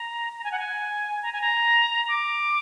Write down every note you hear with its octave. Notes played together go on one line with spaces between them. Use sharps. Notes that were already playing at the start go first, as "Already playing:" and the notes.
Already playing: A#5
A#5
G#5
F#5
G#5
A#5
G#5
A#5
D6